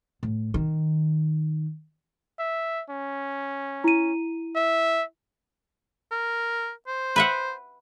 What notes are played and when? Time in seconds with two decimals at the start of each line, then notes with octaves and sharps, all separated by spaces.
0.23 A2
0.54 D#3
2.39 E5
2.90 C#4
3.84 E4 D#7
4.56 E5
6.11 A#4
6.87 C5
7.16 B4 E5 F#5